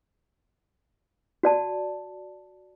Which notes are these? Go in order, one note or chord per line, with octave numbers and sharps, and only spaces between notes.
F#4 D5 A5